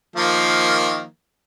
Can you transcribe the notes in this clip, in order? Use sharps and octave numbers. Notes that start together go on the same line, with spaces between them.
D#3 F3 A#3